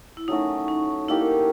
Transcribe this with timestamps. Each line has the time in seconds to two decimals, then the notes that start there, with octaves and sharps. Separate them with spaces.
0.17 E4
0.28 F#3 A3 C#4 D#4 F#4
0.68 D#4
1.08 A#3 D#4 E4 G4